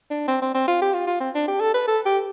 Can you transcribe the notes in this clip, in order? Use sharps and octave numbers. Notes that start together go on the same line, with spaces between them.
D4
C4
C4
C4
F4
G4
F4
F4
C4
D4
G4
A4
B4
A4
G4